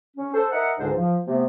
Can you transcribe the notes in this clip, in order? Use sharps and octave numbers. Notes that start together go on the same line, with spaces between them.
C#4
A4 C5
A#4 D#5 E5 F#5
C#2 G#2 D3 D4 D#4 C5
F3
C3 A3 B3